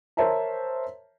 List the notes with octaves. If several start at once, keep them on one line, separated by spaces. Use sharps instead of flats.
A#4 C5 C#5 E5 A5 A#5